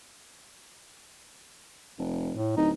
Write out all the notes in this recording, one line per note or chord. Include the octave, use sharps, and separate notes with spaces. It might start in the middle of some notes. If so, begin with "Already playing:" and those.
F1
A2
D1 D#4